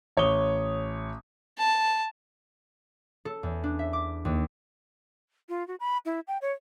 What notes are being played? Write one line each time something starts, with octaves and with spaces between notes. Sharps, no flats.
A1 C#5 C#6 D#6 G7
A5
A4
E2
D4
E5
D6
D#2
F4
F#4
B5
E4
G5
C#5